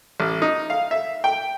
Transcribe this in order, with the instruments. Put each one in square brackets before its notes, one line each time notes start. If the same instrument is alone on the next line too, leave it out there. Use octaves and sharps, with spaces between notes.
[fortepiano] A1
D#4
F5
E5
G5